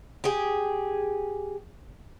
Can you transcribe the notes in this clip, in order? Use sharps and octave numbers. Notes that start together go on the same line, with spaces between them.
G4 G#4